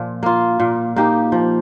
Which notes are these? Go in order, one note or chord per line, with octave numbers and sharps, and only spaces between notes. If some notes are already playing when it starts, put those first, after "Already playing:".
Already playing: A#2 F3
A#3 F4
A#2
A#3 D#4 G4
F3